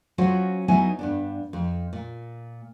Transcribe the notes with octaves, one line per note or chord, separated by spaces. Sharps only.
F#3 C#4 F4 F#4 C5
F#3 B3 D#4 E4 G#5
G2 B3 D4
F2
A#2